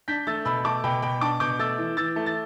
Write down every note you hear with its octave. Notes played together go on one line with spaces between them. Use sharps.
D4 G6 B6
A3 E6 A6
B2 B5 E6
A3 A5 D6
B2 G5 B5
B2 G5 B5
D4 A5 D6
B2 D6 G6
A3 E6 A6
E3
E3 E6 A6
A3
A6